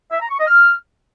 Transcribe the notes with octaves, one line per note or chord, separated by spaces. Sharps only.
E5
A#5
C#6
D#5
F6